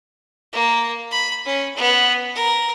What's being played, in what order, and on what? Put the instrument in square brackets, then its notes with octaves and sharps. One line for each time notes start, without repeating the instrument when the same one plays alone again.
[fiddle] A#3
B5
C#4
B3
A#4